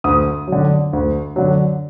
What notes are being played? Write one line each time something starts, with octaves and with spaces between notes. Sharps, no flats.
D2 D#6
D3 F#3
D2
D3 F#3